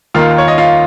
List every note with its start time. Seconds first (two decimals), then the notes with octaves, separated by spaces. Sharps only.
0.14 D#2 D#3 A#3 F4 F5
0.38 C#5
0.48 D#5
0.58 F4 F5